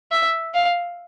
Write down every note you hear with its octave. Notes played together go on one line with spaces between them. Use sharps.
E5
F5